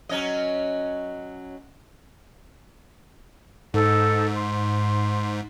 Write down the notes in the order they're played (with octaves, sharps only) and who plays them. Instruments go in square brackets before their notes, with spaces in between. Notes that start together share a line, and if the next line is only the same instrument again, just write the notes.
[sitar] F#3 C#4 D#5
[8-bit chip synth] G#2 [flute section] D#4 A4
[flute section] C6